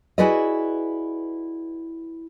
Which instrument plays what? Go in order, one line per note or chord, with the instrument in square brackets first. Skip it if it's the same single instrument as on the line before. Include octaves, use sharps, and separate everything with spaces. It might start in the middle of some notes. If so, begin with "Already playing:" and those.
[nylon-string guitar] E4 F#4 G#4 B4 D5 D#5